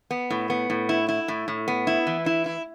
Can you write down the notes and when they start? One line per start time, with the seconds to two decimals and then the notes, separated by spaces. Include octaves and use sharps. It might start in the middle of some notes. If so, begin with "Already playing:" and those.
0.11 B3
0.30 A2
0.50 B3
0.70 A2
0.89 E4
1.08 E4
1.28 A2
1.48 A2
1.68 B3
1.87 E4
2.07 E3
2.26 E4
2.46 E4